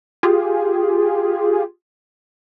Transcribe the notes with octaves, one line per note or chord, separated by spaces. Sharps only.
F4 G4 G#4